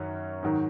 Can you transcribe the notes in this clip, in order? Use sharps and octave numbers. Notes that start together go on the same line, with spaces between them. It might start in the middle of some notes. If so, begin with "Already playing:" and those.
Already playing: F#2 D#3 F#3 C#4
G#2 D#3 F#3